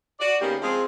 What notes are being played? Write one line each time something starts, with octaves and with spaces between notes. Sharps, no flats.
F#4 D5
C#3 A#3 B3 C#4 D#4 G4
F3 G#3 C4 F4 G#4